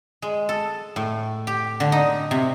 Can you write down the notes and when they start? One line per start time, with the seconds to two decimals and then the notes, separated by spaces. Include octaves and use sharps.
0.22 G#3
0.49 A4
0.96 A2
1.47 G4
1.80 D3
1.92 D#4
2.31 C3